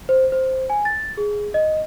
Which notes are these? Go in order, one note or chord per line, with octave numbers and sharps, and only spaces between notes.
C5
C5
G#5
A6
G#4
D#5